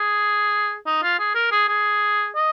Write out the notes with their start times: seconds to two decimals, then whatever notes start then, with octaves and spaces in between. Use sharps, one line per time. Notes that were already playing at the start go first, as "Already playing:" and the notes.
Already playing: G#4
0.86 D#4
1.03 F4
1.19 G#4
1.35 A#4
1.51 G#4
1.68 G#4
2.35 D#5